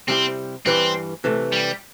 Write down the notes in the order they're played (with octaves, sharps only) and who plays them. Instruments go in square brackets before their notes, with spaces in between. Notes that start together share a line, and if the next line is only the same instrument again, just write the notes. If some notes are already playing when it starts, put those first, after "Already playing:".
[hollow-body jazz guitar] C3 G3 E4 G4 [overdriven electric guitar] C4
[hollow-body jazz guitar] G2 E3 G3 [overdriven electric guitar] C4
[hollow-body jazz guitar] C3 E3 A3
[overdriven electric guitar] G3